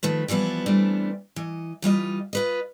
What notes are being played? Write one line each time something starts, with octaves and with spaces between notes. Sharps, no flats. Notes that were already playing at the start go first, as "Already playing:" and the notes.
D#3 F3 A3 B4
E3 F3 G3 B3 E4
E3 G3 A3 B3 C4 D4
E3 D#5
E3 G3 F4 D#5
F4 B4 D#5